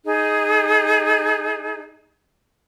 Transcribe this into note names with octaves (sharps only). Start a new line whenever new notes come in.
D#4 G#4